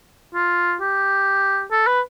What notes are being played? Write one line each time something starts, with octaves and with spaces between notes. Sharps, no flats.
F4
G4
A4
B4